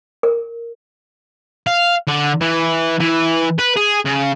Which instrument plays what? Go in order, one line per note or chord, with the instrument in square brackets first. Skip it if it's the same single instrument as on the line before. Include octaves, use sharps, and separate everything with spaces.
[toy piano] A#4
[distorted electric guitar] F5
D3
E3
E3
B4
G#4
C#3